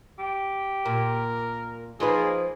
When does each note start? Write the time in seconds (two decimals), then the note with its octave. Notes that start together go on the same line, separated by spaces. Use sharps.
0.19 G4
0.86 A#2 A#4
2.00 F3 A#3 D#4 G#4 B4